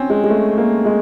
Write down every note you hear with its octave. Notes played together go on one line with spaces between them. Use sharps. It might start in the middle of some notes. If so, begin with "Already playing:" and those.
Already playing: C4 C#4
G#3
G#3
A3
A#3
G#3